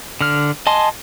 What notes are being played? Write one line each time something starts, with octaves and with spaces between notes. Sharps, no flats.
D3 F6
D#5 G#5 A5 C6